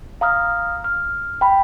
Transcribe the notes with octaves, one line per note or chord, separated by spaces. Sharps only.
F5 A#5 D#6 F6
F6
G5 B5